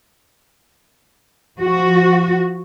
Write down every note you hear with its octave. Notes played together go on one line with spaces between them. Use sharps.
F3 F#4